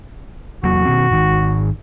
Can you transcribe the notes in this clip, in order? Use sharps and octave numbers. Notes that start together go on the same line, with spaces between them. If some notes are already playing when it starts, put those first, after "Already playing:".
E2 F#3 A#3 F#4
B2 D#3 C4
G#1 D#3